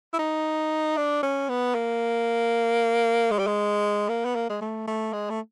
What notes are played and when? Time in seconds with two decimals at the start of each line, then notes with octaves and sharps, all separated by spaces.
0.13 E4
0.19 D#4
0.97 D4
1.23 C#4
1.49 B3
1.75 A#3
3.31 G#3
3.39 G3
3.47 G#3
4.09 A#3
4.25 B3
4.35 A#3
4.50 G#3
4.61 A3
4.87 A3
5.13 G#3
5.30 A3